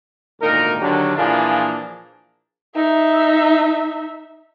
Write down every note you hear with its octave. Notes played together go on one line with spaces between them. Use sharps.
G#1 D2 A#2 D#4 A#4
D3 D#3 F#3 D4 G4
A#2 E3 F3 A#3 D4 G#4
D#4 E5